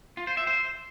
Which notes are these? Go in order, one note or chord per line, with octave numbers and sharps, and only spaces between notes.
F4
C5
E5
C5